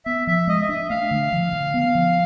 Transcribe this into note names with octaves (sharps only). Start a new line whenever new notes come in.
B3 E5
F3 E5
G#3 D#5
D#5
D4 E5
A3 F5
D3
F3
D3
B3
F3